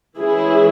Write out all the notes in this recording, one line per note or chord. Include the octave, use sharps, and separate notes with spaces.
E3 G#3 C#4 E4 G#4